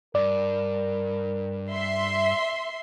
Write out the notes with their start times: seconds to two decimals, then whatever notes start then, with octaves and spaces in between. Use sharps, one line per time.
0.15 G2 A#4 D5
1.71 E5 C6